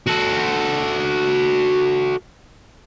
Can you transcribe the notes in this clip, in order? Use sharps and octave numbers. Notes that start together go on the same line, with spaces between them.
F#4 A4